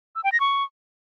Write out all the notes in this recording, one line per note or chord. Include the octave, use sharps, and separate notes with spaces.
E6
G5
A#6
C#6